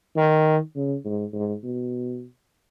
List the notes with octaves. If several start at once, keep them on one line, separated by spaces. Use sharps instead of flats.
D#3
C#3
G#2
G#2
B2